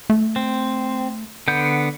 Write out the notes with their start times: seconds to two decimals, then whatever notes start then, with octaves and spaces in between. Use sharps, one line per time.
0.10 A3
0.36 C4
1.48 D3 B3 G6